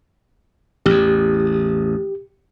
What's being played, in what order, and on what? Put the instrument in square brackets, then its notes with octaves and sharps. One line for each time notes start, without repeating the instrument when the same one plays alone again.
[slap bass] A1 E2 [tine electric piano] G4